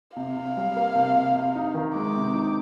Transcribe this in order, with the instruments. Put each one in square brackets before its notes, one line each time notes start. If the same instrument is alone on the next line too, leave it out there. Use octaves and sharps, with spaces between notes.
[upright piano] C3 [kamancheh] F5
[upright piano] C3
G3
A#3
C3
C3
C3
D#4
D#3
[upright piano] G#3 [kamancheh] D6
[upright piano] C3
D#4